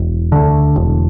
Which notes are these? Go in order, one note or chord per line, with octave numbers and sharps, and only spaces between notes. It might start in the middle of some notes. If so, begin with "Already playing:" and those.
Already playing: E1
D2 D3
E1